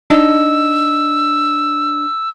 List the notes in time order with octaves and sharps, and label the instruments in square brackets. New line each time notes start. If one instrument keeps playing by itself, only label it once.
[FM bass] D4 [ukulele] D#4 D#5 A5 [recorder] E6